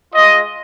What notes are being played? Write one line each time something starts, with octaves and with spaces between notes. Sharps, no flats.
G#3 F4 D#5